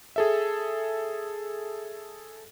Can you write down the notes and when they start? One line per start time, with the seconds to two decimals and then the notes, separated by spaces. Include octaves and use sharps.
0.16 G#4 A4 E5